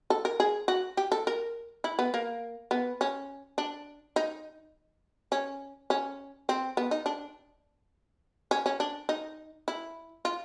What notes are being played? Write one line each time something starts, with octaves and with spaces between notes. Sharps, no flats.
A4
A#4
G#4
F#4
G4
A4
A#4
E4
B3
A#3
B3
C#4
D4
D#4
C#4
C#4
C4
B3
D#4
D4
C#4
C#4
D4
D#4
E4
F4